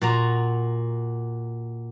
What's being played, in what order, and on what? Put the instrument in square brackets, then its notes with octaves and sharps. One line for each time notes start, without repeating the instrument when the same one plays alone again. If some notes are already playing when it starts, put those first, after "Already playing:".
[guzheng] A#2 F#4 A#5